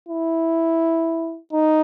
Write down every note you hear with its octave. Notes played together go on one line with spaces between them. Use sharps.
E4
D#4